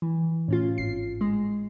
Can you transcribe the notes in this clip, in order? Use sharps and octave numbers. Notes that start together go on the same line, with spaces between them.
E3
A2 C#4 F4
G#1 C7
G#3